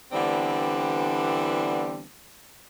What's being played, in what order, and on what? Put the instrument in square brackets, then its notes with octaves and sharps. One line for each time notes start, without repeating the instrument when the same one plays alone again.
[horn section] D3 E3 G3 B3 C4 D4